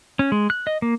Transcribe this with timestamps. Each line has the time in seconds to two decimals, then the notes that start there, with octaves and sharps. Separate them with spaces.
0.19 C#4
0.32 G#3
0.50 F#6
0.67 D#5
0.82 A#3